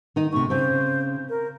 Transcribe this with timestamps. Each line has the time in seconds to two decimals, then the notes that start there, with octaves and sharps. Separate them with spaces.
0.16 D#3 D#4
0.32 D2 C3 C#6
0.50 C#3 C4 C5
1.29 A#4